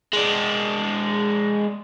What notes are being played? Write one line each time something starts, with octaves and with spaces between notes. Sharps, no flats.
G#3 D4